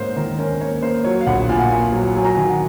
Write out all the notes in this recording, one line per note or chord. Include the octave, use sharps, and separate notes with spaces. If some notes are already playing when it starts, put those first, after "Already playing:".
Already playing: G#2 A#3 C#4 C5
D#3 A#4
C#4 A#4
A#3 C#5
A#3 C5
F#3 C#5
F5
A#1 F#5
A#2 G#5
F#5
A#3 G#5
F#3
F#3 G#5
A#5
D#3 G#5
F#5